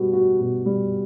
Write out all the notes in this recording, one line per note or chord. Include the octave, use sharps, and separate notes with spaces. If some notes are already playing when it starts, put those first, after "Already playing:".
Already playing: B2 G3 F#4
F#4
B2
G3